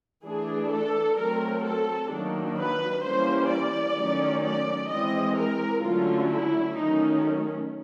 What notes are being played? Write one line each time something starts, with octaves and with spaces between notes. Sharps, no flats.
E3 A3 D4 G#4
A4
F#3 A3 C4 A#4
A4
D#3 F#3 A#3 D4
B4
E3 G3 A#3 C#4 C5
D5
D#3 F#3 A3 C#4
D5
E3 G#3 C4 D#5
A#4
D3 F#3 A3 C#4 F4
E4
D#3 F#3 A3 C#4 D#4